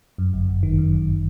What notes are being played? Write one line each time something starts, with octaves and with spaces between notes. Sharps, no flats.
F#2
G1
G1
D#3
F#2
G1